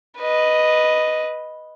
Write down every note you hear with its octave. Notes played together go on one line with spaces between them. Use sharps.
B4 D#5